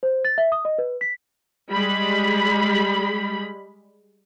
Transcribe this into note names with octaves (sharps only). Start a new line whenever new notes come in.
C5
A6
E5
D#6
D#5
B4
B6
G3 G#3 B5